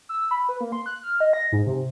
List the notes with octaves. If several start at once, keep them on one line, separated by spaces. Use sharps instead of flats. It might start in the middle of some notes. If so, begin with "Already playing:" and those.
E6
B5
B4
A#3
C6
F#6
F6
D#5
A#6
G#2
C3